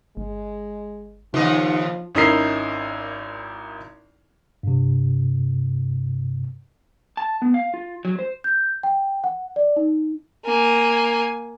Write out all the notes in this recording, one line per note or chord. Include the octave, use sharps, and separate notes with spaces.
G1 G#3
D#2 C#3 F3 B3 D#4 D#5
G#1 C#4 D#4 E4 A#4 C7
G2 C3
A5
B3
F5
F4
F#3
C5
G6
G5
F#5
D5
D#4
A#3 G#5